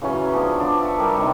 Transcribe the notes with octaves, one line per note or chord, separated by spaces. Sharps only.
C#3 E3 F#3 C#4
F3 B3 D4
D4
E5 A5 C#6
G3 A#4
C3 D#3